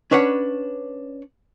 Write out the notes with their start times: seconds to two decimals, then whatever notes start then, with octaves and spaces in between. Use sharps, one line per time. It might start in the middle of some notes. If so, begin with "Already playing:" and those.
0.11 C#4 D4 B4 C#5 F#5